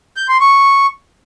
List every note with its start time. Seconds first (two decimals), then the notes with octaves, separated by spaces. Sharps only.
0.17 G6
0.29 C6
0.40 C#6